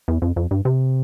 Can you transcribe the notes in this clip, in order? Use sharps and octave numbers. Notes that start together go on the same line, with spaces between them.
E2
F2
F2
G2
C3